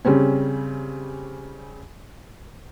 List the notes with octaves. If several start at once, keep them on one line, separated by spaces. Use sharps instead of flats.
C#3 G3 C4 C#4